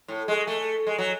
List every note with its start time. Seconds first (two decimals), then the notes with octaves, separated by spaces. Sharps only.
0.08 A2
0.28 G#3
0.47 A3
0.87 G#3
0.98 F#3